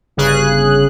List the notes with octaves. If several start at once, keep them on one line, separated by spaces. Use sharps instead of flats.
G1 C#3 G#4 F#6